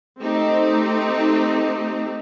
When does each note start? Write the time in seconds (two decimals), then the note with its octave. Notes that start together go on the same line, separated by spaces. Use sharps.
0.21 A3 C4 D#4 G4